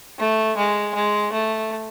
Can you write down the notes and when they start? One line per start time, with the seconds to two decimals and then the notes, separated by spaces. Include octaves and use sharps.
0.19 A3
0.57 G#3
0.94 G#3
1.32 A3